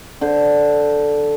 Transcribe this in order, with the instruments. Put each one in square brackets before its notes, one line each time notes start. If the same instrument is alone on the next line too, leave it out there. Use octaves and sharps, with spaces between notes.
[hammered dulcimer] D3 C5